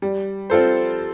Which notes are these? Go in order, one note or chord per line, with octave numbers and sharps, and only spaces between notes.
G3
C4 F4 A4 C5